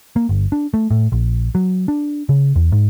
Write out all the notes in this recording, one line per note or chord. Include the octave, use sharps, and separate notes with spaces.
A#3
G1
D4
A3
A2
A#1
F#3
D4
C#3
E2
G#2